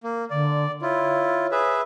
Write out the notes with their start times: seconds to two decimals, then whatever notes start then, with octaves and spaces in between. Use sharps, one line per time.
0.04 A#3
0.30 D3 D5
0.82 E4 F4 C#5
1.52 G#4 B4 E5